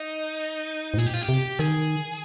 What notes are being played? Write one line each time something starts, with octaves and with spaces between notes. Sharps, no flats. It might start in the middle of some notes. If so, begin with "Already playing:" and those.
Already playing: D#4
G#2
A#2 G#4
G4
F4
G4
C3
D#3 G#4